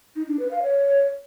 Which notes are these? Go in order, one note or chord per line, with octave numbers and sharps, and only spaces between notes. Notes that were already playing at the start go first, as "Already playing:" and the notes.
D#4
D4
B4
F5
C#5